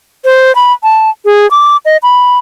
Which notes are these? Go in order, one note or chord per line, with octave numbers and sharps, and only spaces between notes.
C5
B5
A5
G#4
D6
D#5
B5